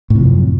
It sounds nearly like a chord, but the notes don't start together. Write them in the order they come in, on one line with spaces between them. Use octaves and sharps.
A2 C3 F3 F#2